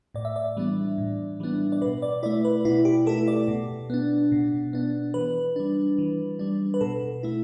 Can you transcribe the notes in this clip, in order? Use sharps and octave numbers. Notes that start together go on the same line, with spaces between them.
A2 D5
E5
D5
E3 G3 B3 D4
A2
E3 G3 B3 D4
D5
B2 B4
D5
A3 E4 D5
B4
B2 E4
G4
A3 E4 A4
D5
B2
B3 D4
B2
B3 D4
E3 B4
G3 D4
E3
G3 D4
B4
B2 A4
A3 E4